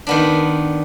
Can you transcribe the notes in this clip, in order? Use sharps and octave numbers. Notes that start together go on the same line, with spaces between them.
D#3 B3 D4